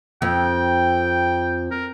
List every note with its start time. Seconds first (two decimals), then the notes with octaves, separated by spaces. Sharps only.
0.22 F2 G5
1.71 A#4